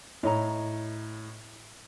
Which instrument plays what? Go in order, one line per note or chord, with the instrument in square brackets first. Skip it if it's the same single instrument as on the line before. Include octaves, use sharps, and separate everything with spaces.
[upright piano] A2 [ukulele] C#5 D#5 A#5